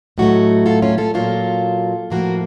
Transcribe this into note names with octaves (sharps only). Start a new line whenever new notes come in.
A2 F#3 A3 D#4 F#4
F4 A4
C#4 F4
F4 A4
A#2 F#3 A#3 F4 A4
A2 F3 A#3 F#4 A#4